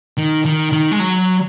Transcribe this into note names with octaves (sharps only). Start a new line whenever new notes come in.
D#3
D#3
D#3
G#3
F#3